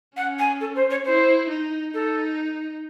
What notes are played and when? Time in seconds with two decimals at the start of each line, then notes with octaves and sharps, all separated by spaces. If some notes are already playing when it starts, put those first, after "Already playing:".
0.16 C#4 F#5
0.39 G#5
0.60 A4
0.75 C5
0.90 C#5
1.05 E4 C5
1.50 D#4
1.94 D#4 A4